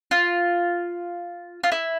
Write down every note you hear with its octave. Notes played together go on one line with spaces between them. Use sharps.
F4
F4
E4